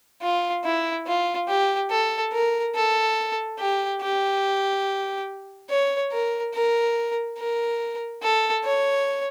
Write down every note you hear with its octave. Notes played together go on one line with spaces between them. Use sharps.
F4
E4
F4
G4
A4
A#4
A4
G4
G4
C#5
A#4
A#4
A#4
A4
C#5